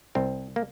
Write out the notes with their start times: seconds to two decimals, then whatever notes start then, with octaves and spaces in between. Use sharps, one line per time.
0.15 C2 C4
0.56 A#3